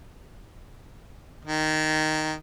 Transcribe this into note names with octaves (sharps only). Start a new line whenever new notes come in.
D#3